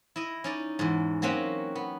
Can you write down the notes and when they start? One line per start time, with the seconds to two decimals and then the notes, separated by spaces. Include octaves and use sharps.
0.16 E4 D#5
0.44 C#4 D#4 D5
0.79 E2 G#2
1.22 F#3 A#3 C4 C#4 F#4 G4
1.76 B3